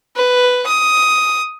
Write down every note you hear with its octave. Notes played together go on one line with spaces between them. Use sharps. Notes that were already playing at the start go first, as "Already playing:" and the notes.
B4
D#6